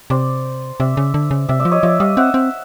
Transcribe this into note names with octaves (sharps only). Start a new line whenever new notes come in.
C3 C5 D5
C3 D5 E5
C#3
D3
C#3
C3 D5 E5
D5 E5
F3
C#5 D#5
F3 D5 E5
G3 D#5 F5
C4 E5 F#5
C4